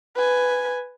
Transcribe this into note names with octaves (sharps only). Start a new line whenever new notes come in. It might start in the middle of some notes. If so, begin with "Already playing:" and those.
B4 G#5